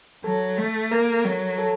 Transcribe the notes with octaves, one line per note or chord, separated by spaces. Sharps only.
F#3 A4
A3
A#3 A#4
F#3
A4